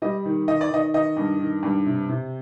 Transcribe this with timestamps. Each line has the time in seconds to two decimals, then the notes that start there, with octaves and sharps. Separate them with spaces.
0.02 G3 D#5
0.25 D#3
0.48 D#3 D#5
0.61 D5
0.70 D#3 D#5
0.94 D#3 D#5
1.17 G2
1.39 D#3
1.63 G2
1.86 C3
2.09 C3